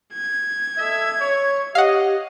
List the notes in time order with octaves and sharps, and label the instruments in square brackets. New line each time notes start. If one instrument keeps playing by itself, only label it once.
[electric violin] G#6
[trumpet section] A4 D#5 E5
C#5
[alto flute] G4 [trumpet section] D#5 [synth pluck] F5 F#5